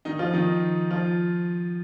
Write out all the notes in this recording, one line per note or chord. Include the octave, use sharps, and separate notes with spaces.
D#3 D#4
F3 F4
D#3 D#4
F3 F4